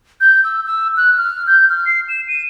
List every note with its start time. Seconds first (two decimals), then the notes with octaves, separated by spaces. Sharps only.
0.21 G6
0.44 E6
0.65 E6
0.97 F#6
1.18 F6
1.47 G6
1.69 F6
1.86 C7
2.09 E7
2.28 D#7